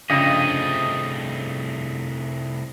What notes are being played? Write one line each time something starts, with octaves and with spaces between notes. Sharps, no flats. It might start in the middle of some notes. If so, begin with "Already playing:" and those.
C2 G2 C#3 F3 A3 D#5